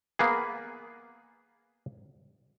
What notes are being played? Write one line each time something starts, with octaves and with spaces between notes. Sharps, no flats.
A#3 B3 G#4